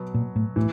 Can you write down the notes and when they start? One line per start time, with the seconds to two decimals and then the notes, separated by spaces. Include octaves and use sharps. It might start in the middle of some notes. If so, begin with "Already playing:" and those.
Already playing: B2 F#3 B3
0.14 A#2
0.36 A2
0.56 A2 E3